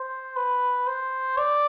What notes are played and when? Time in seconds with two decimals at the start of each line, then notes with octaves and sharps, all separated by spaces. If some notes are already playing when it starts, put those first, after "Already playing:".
Already playing: C5
0.36 B4
0.87 C5
1.37 D5